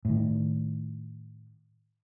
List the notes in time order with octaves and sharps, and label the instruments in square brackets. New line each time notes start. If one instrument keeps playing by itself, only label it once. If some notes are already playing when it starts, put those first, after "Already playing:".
[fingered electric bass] A2 D#3